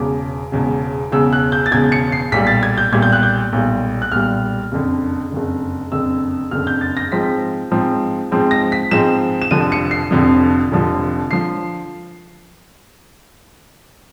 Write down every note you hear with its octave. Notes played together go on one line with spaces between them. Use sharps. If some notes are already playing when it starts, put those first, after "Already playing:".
Already playing: E1 E2 C#3 D6
E1 E2 C#3
E1 E2 C#3 E6
F#6
G6
A6
E1 E2 C#3 G#6
C#7
C7
B1 A#2 G3 B6
A6
G#6
G6
B1 A#2 G3 G#6
G6
F#6
G6
B1 A#2 G3
F#6
B1 A#2 G3 F6
F#1 F2 D3
F#1 F2 D3
F#1 F2 D3 E6
F#1 F2 D3 F6
G6
A6
A#6
G#2 F3 G#3 C4 B6
G#2 F3 G#3 C4
G#2 F3 G#3 C4
A#6
B6
G#2 F3 G#3 C4 E7
E7
F1 F2 D3 F3 D#7
C#7
C7
F1 F2 D3 F3
F1 F2 D3 F3
D3 F3 C7